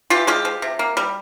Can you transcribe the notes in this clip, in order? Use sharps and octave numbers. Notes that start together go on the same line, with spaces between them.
E3 F4 G4
G#3 F4 G4
F3
C3
A#3
G3